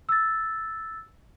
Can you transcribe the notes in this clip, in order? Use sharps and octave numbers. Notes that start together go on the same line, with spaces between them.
E6 A6